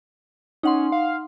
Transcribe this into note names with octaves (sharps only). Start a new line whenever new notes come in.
C#4 D#4 F#5 C6
F5